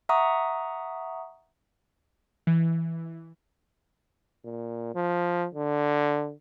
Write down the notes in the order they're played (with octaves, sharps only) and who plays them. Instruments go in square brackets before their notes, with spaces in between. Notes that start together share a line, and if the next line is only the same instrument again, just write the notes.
[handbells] E5 F#5 A#5 C#6 D#6
[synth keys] E3
[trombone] A#2
F3
D3